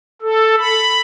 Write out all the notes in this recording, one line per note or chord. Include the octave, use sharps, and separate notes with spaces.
A4
B5